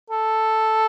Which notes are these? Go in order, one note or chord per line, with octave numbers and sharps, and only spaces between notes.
A4